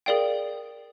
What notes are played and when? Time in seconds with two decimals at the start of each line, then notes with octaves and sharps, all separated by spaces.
0.06 G#4 A#4 D5 F5 G5